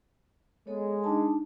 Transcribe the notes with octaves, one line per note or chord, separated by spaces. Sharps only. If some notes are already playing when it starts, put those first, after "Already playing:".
G#3 B3 A4 C#5
D4 D#4 A5